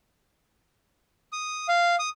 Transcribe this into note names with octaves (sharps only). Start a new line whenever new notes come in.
D#6
F5
D#6